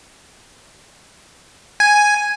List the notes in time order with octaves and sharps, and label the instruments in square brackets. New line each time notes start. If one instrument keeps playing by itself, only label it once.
[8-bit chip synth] G#5